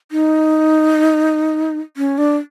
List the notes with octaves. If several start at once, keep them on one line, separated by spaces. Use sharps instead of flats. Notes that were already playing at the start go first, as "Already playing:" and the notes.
D#4
C#4
D4